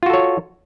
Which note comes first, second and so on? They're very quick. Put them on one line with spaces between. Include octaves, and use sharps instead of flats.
F4 F#4 A4 C#5